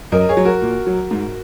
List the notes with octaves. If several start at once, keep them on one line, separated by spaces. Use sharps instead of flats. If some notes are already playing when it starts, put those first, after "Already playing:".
F#2 A#4 D#5
G#4 C#5
F#3
F#4 A#4
A#2
F#3
G#2